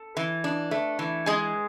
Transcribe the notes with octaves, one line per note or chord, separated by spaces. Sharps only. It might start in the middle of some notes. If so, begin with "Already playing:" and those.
Already playing: A4
E3
D4
A3
E3
G#3 G#4 G#5